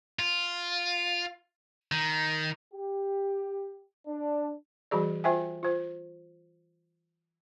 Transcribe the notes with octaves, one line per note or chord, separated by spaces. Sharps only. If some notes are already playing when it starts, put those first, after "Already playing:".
F4
D#3
G4
D4
E3 G3 F#4 G#4 D5
F4 C5 E5 G5 G#5
F4 C5